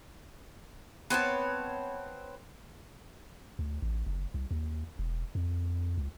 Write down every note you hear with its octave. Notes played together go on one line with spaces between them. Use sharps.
B3 C4 C#5 A5
D2
A1
F#1
C2
D#2
E1
F2
C#2